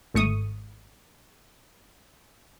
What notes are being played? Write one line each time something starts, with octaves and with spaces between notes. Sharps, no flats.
G#1 A3 C#6 D#6